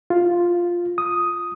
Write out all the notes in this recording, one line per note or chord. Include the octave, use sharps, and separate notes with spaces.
F4
D#6